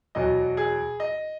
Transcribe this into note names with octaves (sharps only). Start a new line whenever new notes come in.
E2 B2 F#3 D#5
G#4
D#5